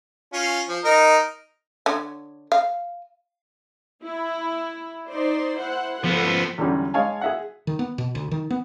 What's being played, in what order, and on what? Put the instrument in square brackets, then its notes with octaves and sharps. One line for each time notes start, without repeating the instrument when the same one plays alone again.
[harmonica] C#4 F4
F3
D#4 A#4 D#5
[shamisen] D3 C#5
F5
[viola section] E4
D#4 C5 D5
E4 C5 F#5
[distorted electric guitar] F3 B3 [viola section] A4 C5
[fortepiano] E2 D3 F#3 G3 C#4
G#3 C#5 F5 G#5 A5
G#4 E5 F#5
[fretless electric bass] D#3
B3
B2
D2
D#3
B3